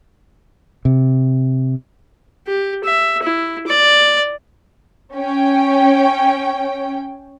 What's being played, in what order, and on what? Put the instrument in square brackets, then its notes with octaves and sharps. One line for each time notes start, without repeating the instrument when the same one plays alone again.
[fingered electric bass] C3
[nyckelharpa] G4
E5
E4
D5
[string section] C#4 G5